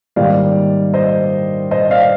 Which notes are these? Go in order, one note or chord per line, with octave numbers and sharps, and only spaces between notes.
G#2 D#3 G3 A#3 D5 F5
C5 D#5
C5 D#5
D5 F5